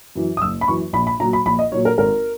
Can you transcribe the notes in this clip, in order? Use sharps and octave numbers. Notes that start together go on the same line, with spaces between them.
F#2 E3
D#6
F#1 E6
B5
F#2 E3 C#6
A#1 B5
B5
A#2 F#3 A#5
B5
A#1 B5
D#5
A#2 F#3 C#5
A#4
G#1 A#4